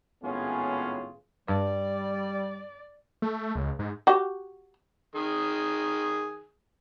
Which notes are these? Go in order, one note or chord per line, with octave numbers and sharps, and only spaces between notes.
G#1 A2 B3 C#4 F4 G#4
G2 G3 D5
A3
C#2
G#2
F#4 G4
D#3 G#4